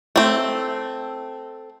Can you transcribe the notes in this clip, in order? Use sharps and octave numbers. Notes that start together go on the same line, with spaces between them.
A3 C4